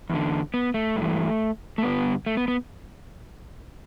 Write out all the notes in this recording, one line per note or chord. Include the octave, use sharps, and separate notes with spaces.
E2 D3
B3
A3
G2
E3
A3
G2 D3 B3
A3
B3
B3